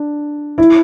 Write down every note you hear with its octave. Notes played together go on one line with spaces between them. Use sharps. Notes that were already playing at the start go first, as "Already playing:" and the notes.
Already playing: D4
E4